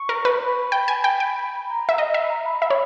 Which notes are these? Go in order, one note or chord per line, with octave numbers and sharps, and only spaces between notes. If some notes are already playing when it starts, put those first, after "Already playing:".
Already playing: C#6
A#4
B4
B5
G5
G#5
G5
G5
A#5
E5
D#5
E5
B5
A#5
B5
E5 B5
C#5